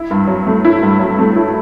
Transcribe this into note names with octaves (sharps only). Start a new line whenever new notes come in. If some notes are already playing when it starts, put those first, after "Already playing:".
Already playing: E4
G2
F#3
A3
E4
G2
F#3
A3
E4